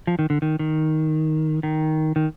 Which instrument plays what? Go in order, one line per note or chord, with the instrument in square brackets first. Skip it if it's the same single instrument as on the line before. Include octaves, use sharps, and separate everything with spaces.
[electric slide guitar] F3
D#3
D3
D#3
D#3
D#3
D#3